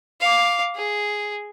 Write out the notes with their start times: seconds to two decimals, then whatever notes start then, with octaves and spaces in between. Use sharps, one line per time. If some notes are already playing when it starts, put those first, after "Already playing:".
0.20 F5 D6
0.75 G#4